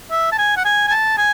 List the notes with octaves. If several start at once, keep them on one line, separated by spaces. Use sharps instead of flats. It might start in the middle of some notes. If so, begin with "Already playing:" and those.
E5
A5
G#5
F#5
G#5
G#5
A5
G#5